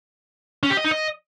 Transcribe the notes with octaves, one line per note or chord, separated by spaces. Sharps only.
C#4
G4
D#5
D#4
D#5